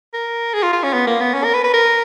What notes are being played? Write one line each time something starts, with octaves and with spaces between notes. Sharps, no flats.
A#4
G#4
F4
F4
C#4
B3
A#3
B3
C#4
A#4
B4
B4
A#4